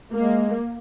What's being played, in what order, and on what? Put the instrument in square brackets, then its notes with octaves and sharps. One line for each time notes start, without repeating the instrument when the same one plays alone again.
[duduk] G#3 [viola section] A#3